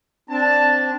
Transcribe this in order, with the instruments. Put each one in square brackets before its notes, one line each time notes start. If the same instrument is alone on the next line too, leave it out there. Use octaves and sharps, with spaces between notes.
[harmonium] C4 D4 [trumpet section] A5